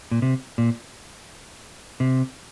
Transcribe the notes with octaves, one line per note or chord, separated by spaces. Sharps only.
A#2
C3
A#2
C3